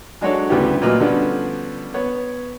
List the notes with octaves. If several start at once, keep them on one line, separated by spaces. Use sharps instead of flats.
F#3 G#3 D4 F#4 A4 C#5
D2 C#3 G3 B3 E4 G4
A#2 F#3 A3 B4 D#5 F6
D3 F3 G3 B3 C#4 D4
B3 C#5